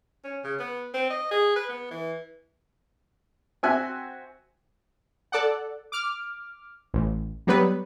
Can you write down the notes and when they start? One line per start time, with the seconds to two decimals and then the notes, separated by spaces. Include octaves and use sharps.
0.24 C#4
0.44 C#3
0.60 B3
0.94 C4
1.11 D#5
1.31 G#4
1.56 B4
1.69 B3
1.91 E3
3.63 C4 F#4 E5 G#5 F#6
5.32 A4 D5 F#5
5.92 D6 F6
6.94 A1
7.47 F#3 G3 B3 B4